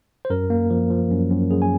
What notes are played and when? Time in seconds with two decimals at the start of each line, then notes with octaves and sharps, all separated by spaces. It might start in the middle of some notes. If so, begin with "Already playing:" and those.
0.25 C5
0.30 F#2 A#4
0.50 A#3
0.70 F3
0.90 F3
1.11 F#2
1.30 F#2
1.51 F#2 G#4
1.62 G#5